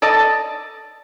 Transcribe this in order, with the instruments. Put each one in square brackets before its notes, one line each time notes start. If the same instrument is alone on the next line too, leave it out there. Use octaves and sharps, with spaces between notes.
[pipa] A4 D5 D#5 A5